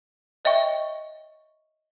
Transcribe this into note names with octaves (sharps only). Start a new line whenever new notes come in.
C#5 D#5 E5 G5 C#6